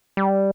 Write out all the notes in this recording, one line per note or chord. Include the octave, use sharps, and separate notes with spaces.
G3